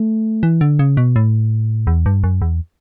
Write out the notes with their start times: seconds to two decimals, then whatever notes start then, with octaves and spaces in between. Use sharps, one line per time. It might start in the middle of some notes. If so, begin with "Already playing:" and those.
Already playing: A3
0.43 E3
0.61 D3
0.79 C#3
0.97 B2
1.16 A2
1.87 E2
2.06 G2
2.24 F#2
2.42 E2